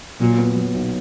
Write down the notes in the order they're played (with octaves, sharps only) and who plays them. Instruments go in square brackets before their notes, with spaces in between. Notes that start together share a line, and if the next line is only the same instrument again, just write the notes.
[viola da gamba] A#2 [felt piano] F#3
[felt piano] B3
F#3
B1